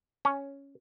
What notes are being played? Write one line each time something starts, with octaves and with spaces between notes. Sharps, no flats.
C#4